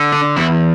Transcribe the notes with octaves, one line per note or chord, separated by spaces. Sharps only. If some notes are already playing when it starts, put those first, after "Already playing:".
Already playing: D3
D4
E2 E4